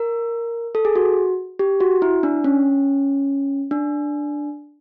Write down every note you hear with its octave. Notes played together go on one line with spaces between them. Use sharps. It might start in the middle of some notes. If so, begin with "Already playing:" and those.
Already playing: A#4
A4
G#4
F#4
G4
F#4
E4
D4
C#4
D4